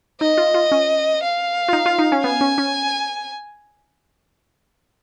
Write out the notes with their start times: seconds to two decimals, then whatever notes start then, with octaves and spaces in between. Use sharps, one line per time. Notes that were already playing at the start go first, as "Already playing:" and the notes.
0.21 D#4 D#5
0.38 F4
0.54 F4
0.72 C#4
1.23 F5
1.68 F4
1.73 D#4
1.86 F4
1.99 D#4
2.12 C#4
2.23 B3 G#5
2.41 C#4
2.58 C#4